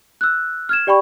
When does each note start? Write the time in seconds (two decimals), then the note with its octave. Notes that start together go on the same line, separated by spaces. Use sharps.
0.21 E6 F#6
0.69 F6 G#6 E7
0.87 G4 D5 G5 B5 C#6